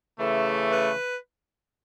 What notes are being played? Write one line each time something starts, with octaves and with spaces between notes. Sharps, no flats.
C#3 E3 A3
B4